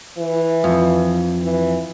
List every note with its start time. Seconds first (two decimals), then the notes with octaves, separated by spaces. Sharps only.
0.18 E3
0.64 F2
1.43 E3